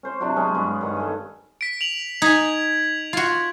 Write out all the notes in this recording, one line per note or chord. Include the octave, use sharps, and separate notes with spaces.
C#4 C5 C6
C3 F#3 D4 F#4
F#3 G#3 B3 C#4
G2 G#3 B3
G2 D#3 F#5
A4 G#5
B6 D7
F7 F#7
D#4 G#5 G#6 B6
F4 F#4